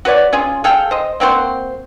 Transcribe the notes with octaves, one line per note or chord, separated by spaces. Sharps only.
F#4 B4 C#5 D5
C#4 F4 G#4
G#4 A4 F5 G5
C5 D#5
A#3 C4 F#4 C5